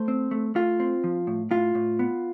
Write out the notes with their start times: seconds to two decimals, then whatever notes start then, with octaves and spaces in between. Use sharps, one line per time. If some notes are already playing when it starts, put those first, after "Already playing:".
Already playing: A3 C5
0.08 C4
0.31 A3
0.55 A3 F4
0.80 C4
1.04 F3
1.27 A2
1.51 A2 F4
1.75 A2
1.99 B3